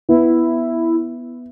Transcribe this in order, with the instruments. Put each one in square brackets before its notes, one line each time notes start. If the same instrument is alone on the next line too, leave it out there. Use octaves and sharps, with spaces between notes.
[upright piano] B3 [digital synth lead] E4